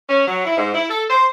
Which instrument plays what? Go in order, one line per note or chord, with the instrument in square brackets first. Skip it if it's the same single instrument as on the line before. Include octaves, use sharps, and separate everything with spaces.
[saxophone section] C#4
F#3
E4
G#2
E4
A4
C5